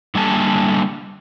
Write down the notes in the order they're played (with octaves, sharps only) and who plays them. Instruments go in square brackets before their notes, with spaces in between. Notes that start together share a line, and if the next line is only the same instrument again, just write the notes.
[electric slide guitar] D3 G3 A3 A#3 G#5 A5